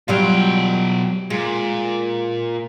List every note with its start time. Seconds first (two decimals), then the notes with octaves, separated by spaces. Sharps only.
0.08 B2 F#3 G3 F4 G5
1.30 A#2 G#3